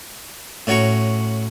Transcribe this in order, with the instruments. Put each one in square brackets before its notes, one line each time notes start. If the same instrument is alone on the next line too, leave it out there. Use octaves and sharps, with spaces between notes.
[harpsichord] A2 C#4 F#4 C#5 A#5 C#6